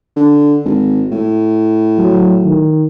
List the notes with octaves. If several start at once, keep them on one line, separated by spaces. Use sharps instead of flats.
D3
G#1
A2
F#3
D#3